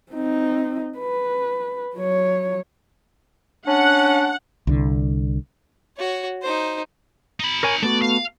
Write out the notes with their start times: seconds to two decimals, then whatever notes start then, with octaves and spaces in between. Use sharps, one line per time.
0.11 C4 D#4
0.98 B4
1.96 F#3 C#5
3.67 C#4 D4 F#5
4.67 C2 D3
5.97 F#4 C#5
6.42 D#4 C5
7.40 D#4 B5
7.63 A#4 C#5 G#5
7.83 A3 B3 F#4 D5
8.02 F5